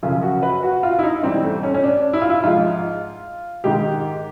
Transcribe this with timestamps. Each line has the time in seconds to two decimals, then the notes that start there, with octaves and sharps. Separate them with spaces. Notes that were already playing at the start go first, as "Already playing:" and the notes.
0.02 F#2 C#3 F3 F4
0.22 F#4
0.43 B4
0.63 F#4
0.83 F4
0.99 E4
1.03 D#4
1.23 G#2 E3 G3 C4
1.44 A3
1.63 C#4
1.74 C#4
1.84 D4
2.13 E4
2.22 F4
2.29 E4
2.44 G#2 F3 G#3 F4
3.64 G#2 D#3 G#3 G4